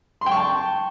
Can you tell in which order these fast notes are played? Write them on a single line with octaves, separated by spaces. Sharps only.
C6 G5 C#6 A5